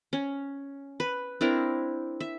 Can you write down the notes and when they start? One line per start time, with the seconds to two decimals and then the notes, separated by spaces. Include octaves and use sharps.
0.13 C#4
1.00 B4
1.41 C4 D4 E4 A#4
2.20 E5